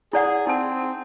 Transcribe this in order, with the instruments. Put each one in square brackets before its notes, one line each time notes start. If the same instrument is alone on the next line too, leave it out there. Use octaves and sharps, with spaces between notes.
[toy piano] E4 D5 F#5 [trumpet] G#4
[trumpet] C4 [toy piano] D#4 A5